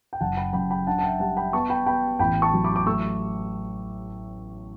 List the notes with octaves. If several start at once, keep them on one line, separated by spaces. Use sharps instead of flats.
G5
F#1 F#5 A5
G5 B5
F#2 G5 B5
G5 B5
D4 F#5 A5
A5
E5 G5
G3 F#5 A5
G5 B5
B3 A5 C#6
G5 B5
B3 G5 B5
A1 G5 B5
A5 C#6
F#3
B5 D6
D6
A3 C#6 E6